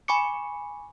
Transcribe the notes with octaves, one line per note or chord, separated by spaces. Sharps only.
G#5 B5 C#6 D6 C#7